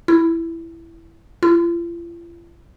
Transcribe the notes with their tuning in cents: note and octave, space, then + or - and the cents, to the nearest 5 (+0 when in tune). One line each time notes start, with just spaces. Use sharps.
E4 +10
F4 -45